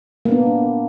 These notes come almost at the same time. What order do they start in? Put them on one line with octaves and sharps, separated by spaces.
A#3 B3 D4